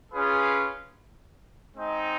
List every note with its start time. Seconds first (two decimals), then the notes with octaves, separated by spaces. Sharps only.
0.12 C#4 F4 G#4 B4
1.76 G#3 C4 D#4